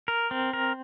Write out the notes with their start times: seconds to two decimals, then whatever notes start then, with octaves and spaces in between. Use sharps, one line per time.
0.08 A#4
0.31 C4
0.53 A#4